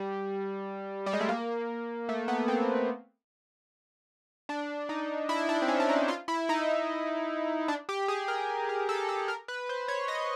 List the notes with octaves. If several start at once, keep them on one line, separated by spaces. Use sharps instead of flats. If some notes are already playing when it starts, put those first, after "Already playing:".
Already playing: G3
G3
G#3
A3
A#3
A3
B3
C4
D4
D#4
E4
D4
C4
C#4
D4
D#4
F4
E4
D#4
D4
G4
G#4
A#4
A#4
A4
A4
A#4
B4
C5
C#5
D#5